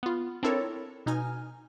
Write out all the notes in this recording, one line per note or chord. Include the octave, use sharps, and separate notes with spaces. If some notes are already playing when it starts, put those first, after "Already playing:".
B3 F4
C4 D4 E4 A4 A#4 C#5
B2 D#4 G#5 F6